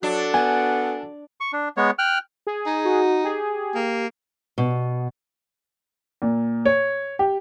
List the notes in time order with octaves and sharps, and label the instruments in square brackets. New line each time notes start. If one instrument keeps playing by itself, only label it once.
[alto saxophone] F#3 [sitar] D4 [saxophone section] F#4 A4
[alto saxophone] B3 [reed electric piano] G#5
[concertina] C#6
D4
G#3 B3 C#5
G5 F6 F#6
[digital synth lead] G#4
[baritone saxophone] D#4
[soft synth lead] F#4
[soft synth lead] G4 [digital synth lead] G#4
[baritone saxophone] A#3
[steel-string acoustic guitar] B2
[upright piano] A#2
C#5
G4